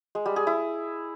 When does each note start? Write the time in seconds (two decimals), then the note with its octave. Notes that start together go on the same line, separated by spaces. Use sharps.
0.15 G#3
0.26 G3
0.36 G#4
0.47 E4